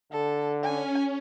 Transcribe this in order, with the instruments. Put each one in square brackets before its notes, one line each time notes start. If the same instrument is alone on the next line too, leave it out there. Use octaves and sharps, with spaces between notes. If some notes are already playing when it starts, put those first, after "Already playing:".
[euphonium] D3 [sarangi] A4
[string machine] C#4 [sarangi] G#5